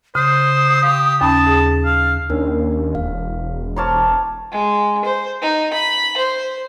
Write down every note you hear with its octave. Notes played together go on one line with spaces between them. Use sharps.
C#3 C5 D#6
G4 F5
D#2 C#4 A5 B5
G#4
F5
D#2 C#4 D4 A#4
E1 F5
C5 C#5 A5 A#5 D6 F6
G#3
C5
D#4
B5
C5